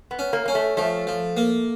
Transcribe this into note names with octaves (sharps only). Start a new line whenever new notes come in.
B3
C#4
A#3
A#3 C#4
A3
F3 A3
F3
A#3